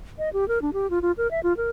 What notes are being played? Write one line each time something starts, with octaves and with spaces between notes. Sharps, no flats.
D#5
G4
A#4
D4
G4
F4
F4
A#4
E5
F4
A#4